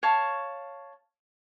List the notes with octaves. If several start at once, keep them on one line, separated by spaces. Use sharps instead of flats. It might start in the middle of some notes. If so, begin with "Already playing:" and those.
C#5 F5 A5 C#6